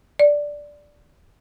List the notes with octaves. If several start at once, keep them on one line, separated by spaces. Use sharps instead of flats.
D5